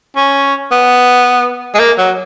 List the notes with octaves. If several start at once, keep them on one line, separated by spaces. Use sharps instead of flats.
C#4
B3
G#3
A#3
F#3